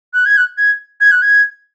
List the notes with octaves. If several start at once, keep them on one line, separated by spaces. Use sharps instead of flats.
F#6
G#6
F#6
G#6
G#6
F#6
G#6